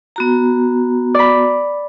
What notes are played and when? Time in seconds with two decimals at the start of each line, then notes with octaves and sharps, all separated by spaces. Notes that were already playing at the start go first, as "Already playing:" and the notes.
0.16 B3 F#4 A#5
1.15 D5 B5